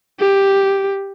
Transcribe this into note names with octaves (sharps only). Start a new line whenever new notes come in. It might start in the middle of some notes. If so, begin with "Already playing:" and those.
G4